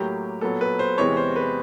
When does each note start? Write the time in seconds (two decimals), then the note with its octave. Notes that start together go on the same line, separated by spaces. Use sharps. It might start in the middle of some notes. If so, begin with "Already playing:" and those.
Already playing: A2 F#3 A#3 G4
0.41 A#2 F#3 B3 A4
0.61 B4
0.79 C5
0.98 E2 C3 E3 G#3 C#5
1.17 C5
1.36 B4